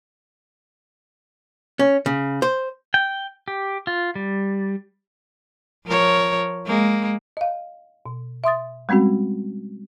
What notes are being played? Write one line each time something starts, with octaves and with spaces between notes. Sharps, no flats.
C#4
C#3
C5
G5
G4
F4
G3
F3 A#4 C#5
G#3 A#3
D#5 F5
B2
E5 C6 D#6 A6
G3 G#3 C4 C#4 F#4